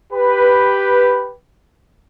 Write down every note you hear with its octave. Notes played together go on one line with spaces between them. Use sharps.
G4 B4